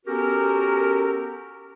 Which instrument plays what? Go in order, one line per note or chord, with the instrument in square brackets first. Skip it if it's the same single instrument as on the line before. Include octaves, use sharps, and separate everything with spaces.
[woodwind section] B3 C#4 F#4 G4 A4 A#4